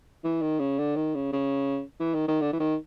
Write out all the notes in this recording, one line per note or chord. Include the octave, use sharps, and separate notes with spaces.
E3
D#3
C#3
D3
D#3
C#3
C#3
E3
D#3
D#3
D3
E3
D#3